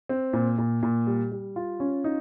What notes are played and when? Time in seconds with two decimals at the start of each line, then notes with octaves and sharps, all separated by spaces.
0.09 C4
0.33 A#2
0.58 A#2
0.83 A#2
1.07 G3
1.32 G3
1.56 F4
1.80 C#4
2.04 D#4